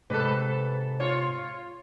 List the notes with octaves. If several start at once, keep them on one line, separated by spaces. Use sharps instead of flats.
G#2 C3 A4 B4 D#5
F4 C#5